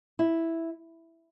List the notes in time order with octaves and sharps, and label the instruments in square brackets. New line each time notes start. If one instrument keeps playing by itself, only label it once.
[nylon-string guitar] E4